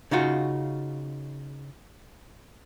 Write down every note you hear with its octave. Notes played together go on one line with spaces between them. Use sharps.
C#3 D#4 F4 F#4